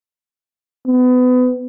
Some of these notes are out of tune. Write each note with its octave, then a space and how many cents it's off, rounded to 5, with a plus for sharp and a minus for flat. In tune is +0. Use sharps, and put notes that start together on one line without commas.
B3 +30